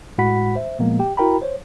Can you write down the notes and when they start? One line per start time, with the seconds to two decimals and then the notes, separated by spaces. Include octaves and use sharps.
0.18 A2 G#3 F#4 F#5 B5 B6
0.55 C5 E5
0.79 A#2 F3 G#3 A#3 B3
0.99 G4 G5
1.17 E4 F#4 A#4 G5 A#5 B5
1.42 C5 C#5